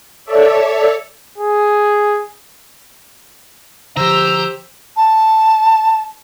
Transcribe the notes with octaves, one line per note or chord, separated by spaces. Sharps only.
A4 C#5 D5 E5
G#4
D3 F3 G4 C5 A#5 E6
A5